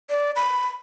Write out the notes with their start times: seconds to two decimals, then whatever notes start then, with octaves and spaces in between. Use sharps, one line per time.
0.10 D5
0.36 B5